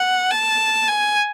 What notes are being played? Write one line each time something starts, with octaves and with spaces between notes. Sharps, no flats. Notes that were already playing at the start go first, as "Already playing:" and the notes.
Already playing: F#5
A5
G#5